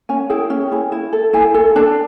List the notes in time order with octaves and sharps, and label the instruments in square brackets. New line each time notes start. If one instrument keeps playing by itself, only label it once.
[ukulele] C#4 G#5
E4 G#4 G5
C#4
E4 G#4
E4
A4
E4 G#5
A4
D4 A5